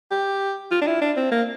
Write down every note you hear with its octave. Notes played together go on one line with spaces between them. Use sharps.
G4
F4
D4
E4
D4
C4
A#3